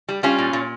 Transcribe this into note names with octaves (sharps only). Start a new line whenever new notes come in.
G3
G3 C#4 F4
A#2
A#2